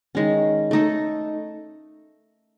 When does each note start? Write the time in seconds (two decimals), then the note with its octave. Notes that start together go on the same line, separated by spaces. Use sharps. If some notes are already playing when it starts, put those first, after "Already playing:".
0.15 D#3 G#3 C#4
0.71 A3 D#4 A4